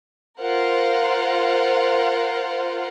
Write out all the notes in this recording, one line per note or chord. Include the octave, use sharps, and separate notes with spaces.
F4 A#4 C5 F5 F#5